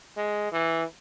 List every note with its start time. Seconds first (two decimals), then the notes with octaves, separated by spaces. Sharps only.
0.17 G#3
0.52 E3